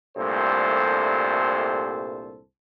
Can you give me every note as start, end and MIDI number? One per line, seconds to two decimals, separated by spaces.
0.17 2.40 36
0.17 2.40 43
0.17 2.40 46
0.17 2.40 57
0.17 2.40 69
0.17 2.40 72